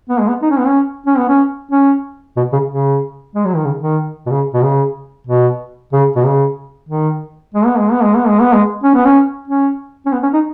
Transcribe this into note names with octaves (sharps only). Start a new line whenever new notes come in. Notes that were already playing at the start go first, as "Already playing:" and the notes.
B3
G#3
B3
D#4
C#4
B3
C#4
C#4
B3
C#4
C#4
B2
C#3
C#3
G#3
F#3
D#3
C#3
D#3
B2
C#3
B2
C#3
B2
C#3
B2
C#3
D#3
G#3
B3
G#3
B3
G#3
B3
G#3
B3
G#3
C#4
B3
C#4
C#4
C#4
B3
C#4
D#4